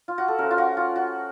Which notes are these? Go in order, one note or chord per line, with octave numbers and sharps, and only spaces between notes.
F4
F#4
A4
F3 A3 C#4 A#4
F4
F#4
F4
F#4